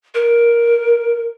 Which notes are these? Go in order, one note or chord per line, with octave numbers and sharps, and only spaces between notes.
A#4